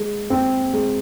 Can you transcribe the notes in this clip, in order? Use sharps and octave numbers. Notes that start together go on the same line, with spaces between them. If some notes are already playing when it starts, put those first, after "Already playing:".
Already playing: G#3
C4
G#3